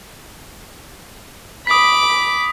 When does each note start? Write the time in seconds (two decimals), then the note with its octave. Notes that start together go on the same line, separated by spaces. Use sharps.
1.67 B5 D6 D#6 B6